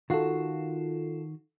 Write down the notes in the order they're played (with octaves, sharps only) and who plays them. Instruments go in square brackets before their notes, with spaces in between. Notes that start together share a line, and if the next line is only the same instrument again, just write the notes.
[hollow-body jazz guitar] D#3 F#4 [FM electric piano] F4 A4